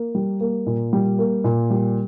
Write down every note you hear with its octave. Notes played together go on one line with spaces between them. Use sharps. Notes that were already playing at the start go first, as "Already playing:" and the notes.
Already playing: A#3
G3
A#3
A#2
G3
A#3
A#2
G3